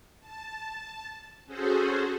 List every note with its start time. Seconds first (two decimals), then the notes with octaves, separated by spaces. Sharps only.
0.20 A5
1.46 C#4 F#4 G#4 A4 C5